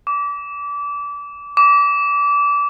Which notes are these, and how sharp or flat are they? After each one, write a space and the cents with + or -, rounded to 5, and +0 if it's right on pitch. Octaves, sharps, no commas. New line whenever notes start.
D6 -25
D6 -25